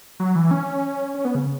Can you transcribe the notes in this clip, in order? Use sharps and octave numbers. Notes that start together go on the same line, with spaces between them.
F#3
E3
C#4
C#4
B3
C#3